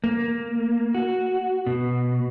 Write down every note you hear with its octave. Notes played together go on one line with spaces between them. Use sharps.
A#3
F#4
B2